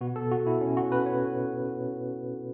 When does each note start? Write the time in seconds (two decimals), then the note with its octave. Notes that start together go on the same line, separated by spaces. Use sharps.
0.01 B2 B3 F#4
0.16 A4
0.31 F#4
0.47 E4
0.61 C#4
0.77 F#4
0.92 B4
1.06 C#5